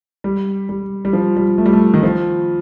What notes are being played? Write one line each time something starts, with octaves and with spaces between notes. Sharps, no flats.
G3
G3
G3
F3
G3
A3
G3
A3
D#3
F3